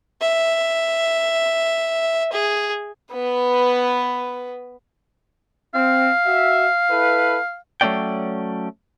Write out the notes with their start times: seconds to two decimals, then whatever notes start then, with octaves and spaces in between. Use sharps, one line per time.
0.21 E5
2.32 G#4
3.13 B3 B4
5.75 C4 F5
6.25 F#4 E5
6.90 E4 A4 B4
7.81 F#3 A3 C4 C#4 D5 G5